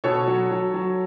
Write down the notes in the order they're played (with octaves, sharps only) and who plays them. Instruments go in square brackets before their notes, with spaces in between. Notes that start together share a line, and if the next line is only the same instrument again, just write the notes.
[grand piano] B2 A4 C#5
F#3
F#3
F#3